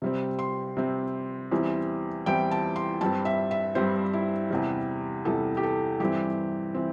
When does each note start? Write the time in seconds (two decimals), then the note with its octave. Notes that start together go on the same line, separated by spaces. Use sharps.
0.02 C3 G3 C4
0.39 C6
0.77 C3 G3 C4
1.51 E2 E3 G3 C4
2.26 E2 E3 G3 C4 G5
2.51 A5
2.76 C6
3.01 G2 G3 C4 A5
3.25 E5
3.51 E5
3.75 G2 G3 C4 C5
4.13 E4
4.51 E2 C3 G3
5.25 E2 C3 G3 A4
5.57 G4
5.63 A4
6.00 G2 E3 C4 G4
6.75 E3 C4